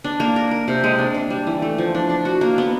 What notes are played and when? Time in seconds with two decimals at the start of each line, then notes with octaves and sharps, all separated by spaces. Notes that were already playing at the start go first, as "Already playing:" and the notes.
0.04 D4
0.20 A#3
0.36 A#4
0.51 A#4
0.68 C3
0.84 G#3
0.99 D4
1.14 D4
1.30 G3
1.47 E3
1.62 A3
1.78 F3
1.95 D4
2.10 D4
2.25 F#4
2.41 A#3
2.58 B3